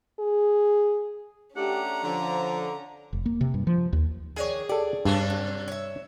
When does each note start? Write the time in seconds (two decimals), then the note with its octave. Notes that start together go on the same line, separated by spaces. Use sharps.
0.20 G#4
1.56 A3 C#4 D4 G4 F#5 A#5
2.04 D3 F3
3.13 F1
3.26 A#3
3.41 C3
3.54 G2
3.67 F3
3.93 D#2
4.36 D#3 D4 G#4 C#5
4.69 G4 A4 D5
5.05 G2 C3 C#4 D4
5.30 F#3
5.68 C#5 E5